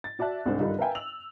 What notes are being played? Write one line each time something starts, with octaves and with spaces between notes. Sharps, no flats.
A6
F#4 D5 E5 A5 F#6
C2 G#2 C4 D4 C5
G2 D3 D#3 G3 D#4 F4
A#4 B4 E5 F5 G5 G#5
E6 F7 F#7